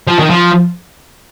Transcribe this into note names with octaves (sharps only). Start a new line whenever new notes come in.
F3
D#3
F3